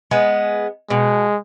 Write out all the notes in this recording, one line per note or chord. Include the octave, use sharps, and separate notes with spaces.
G#3 B3
B2 G#3